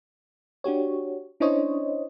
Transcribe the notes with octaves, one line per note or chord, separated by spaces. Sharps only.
D4 F#4 G4 C#5
C#4 D4 E4 C5 C#5 D#5